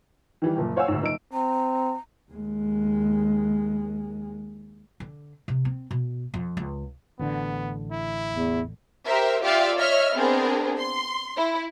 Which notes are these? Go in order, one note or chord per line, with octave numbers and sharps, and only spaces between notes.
D#3 E3 G3
F#1 A#2
C5 C#5 F5 F#5 G#5 E6
D2 G#2
F#1 D#4 E6 D7
C4 A#5
D#2 G#3
D3
C3
C4
B2
F2
C#2
A1 D3 B3
E4
E2
G4 A#4 C5 E5
F4 G4 D5 E5 F5
C#5 D#5 E5 F6
B3 C4 D4 G#4 A#4
C6
E4